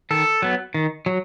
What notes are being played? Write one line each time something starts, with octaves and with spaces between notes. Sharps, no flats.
D#3 A4
F#3 B3
D#3
F#3